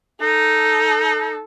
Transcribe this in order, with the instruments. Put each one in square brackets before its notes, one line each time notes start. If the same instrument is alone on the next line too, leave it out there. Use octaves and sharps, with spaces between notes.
[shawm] D#4 [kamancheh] A4